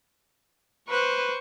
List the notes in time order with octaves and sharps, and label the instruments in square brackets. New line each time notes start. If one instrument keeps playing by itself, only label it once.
[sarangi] B4 [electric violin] C5 C#6